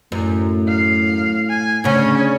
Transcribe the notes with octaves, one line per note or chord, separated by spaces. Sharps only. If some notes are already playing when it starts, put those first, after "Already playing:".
F#2 A2
F5
G#5
D2 C#3 C#4